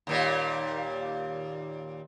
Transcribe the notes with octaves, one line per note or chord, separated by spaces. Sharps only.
D#2 A#2 G3